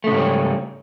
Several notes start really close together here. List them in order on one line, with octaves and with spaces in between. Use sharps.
A3 C#3 G#2 G3 C#4